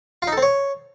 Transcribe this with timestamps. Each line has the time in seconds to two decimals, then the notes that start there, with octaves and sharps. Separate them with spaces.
0.22 F4
0.27 D#4
0.32 A4
0.37 C4
0.42 C#5